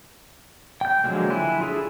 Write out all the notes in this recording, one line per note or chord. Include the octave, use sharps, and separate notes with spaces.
G5 G6
D3 F3 F#3 G#3 A#3
E4 G#5 C6 F#6
D4 F4 G#4 A4